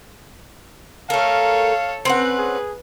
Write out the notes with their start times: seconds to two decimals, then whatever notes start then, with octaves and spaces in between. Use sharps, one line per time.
1.10 A3 A4 A#4 C#5 F5
2.05 C4 C#4 B4 F#5
2.38 G#4